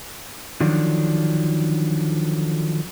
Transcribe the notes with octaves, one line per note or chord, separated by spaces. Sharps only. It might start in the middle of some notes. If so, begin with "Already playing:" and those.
D3 D#3 F3 F#3 D4